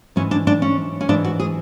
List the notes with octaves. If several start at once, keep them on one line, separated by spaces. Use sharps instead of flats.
G#2 E3 C#4
D4
D4
C#4
C#4
G#2 E3 D4
F#4
G#4